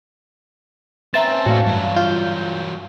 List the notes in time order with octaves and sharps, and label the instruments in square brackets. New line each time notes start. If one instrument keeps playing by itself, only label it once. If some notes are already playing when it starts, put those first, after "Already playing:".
[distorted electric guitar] C4 C#4 [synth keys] B4 E5 A#5 [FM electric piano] A5
[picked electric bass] A2 A3 [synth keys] F#4 D5 F5
[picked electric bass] G2 [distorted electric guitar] E3 F#3
[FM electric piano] F4 G6